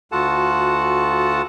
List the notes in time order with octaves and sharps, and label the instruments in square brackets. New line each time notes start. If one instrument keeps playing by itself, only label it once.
[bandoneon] D2 F4 F#4 A4 F#5 A5